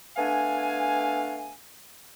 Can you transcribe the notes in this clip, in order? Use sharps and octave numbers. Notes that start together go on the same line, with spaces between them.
A3 B3 D4 F5 G#5